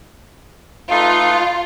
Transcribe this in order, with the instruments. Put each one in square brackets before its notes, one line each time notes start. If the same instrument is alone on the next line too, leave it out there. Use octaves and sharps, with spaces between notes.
[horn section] A3 D#4 B4 [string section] F4